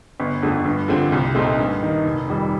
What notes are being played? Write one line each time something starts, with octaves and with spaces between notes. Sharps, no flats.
G1
F2 D3 A3
G2
D3 F3 A3 C4
C2
A#2 A3 C4 D#4
G2
D#3 A#3 D#4
F1
F2 D#3 G3